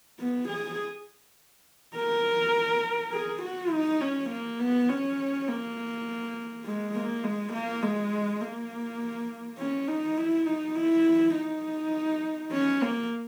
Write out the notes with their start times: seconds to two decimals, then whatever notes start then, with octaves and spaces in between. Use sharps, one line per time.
0.19 B3
0.49 G#4
1.96 A#4
3.13 G#4
3.42 F#4
3.71 D#4
4.01 C#4
4.30 A#3
4.59 B3
4.89 C#4
5.48 A#3
6.65 G#3
6.95 A#3
7.23 G#3
7.53 A#3
7.82 G#3
8.41 A#3
9.58 C#4
9.88 D#4
10.17 E4
10.46 D#4
10.76 E4
11.35 D#4
12.52 C#4
12.81 A#3